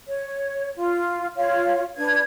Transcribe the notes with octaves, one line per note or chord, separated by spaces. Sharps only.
C#5
F4
F4 C#5 F5
D4 B4 G#6